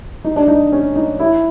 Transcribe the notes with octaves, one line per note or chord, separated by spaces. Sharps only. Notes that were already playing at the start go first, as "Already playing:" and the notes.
D#4
D4
D#4
C#4
D#4
E4